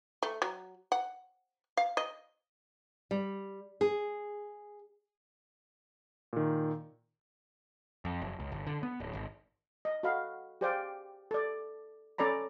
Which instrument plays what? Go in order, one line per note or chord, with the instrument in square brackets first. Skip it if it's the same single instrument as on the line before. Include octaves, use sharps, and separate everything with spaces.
[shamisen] A3
F#3
F#5
F5
D#5
[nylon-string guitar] G3
G#4
[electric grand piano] A#2 D#3
[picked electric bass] F2
F#1
C#2
G1
D3
B3
D1
G#1
[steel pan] D#5
F#4 A4 D#5 F5 B5
G4 G#4 C5 D5 F5 G5
A4 D5
C#4 A4 D5 A#5 B5